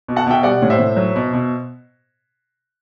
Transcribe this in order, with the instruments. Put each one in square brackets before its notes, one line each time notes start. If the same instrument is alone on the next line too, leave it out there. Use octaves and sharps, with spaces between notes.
[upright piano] B2
F#5 A5
B2 E5 G5
G3 D5 F#5
A2
C5 E5
A2
F#3
B2
B2